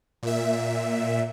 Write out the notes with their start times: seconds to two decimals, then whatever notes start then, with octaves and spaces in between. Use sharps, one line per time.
0.23 A#2 E5